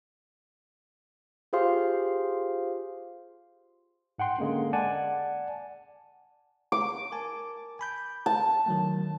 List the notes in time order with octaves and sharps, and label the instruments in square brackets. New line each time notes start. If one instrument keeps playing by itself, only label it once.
[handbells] F4 G4 G#4 C5 F5 C6
[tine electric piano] G#2 F#5 G5 C6
D3 G#3 A#3 C#4
D5 F#5 G#5 A5
[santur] D6
[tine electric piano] A#4 G#5 A5
G#5 B5 G6
[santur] A5
[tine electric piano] D#3 F#3 A3